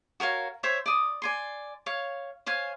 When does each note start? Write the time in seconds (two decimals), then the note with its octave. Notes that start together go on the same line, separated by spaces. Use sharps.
0.20 F#4 A#4 C#5 F5
0.63 C5 C#5 E5 G5
0.86 D5 D#6
1.22 D5 G#5 C6
1.86 C#5 F5
2.46 C5 C#5 F5 G#5